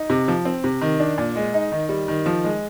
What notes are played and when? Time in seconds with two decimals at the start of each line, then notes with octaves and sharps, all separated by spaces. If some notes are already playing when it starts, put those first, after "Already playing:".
Already playing: D#4
0.10 C3
0.28 F3
0.45 C4
0.64 C3
0.81 D#3
1.00 D4
1.18 A#2
1.36 G#3
1.54 D#4
1.72 D#3
1.89 G3
2.08 D#3
2.26 F3
2.44 G#3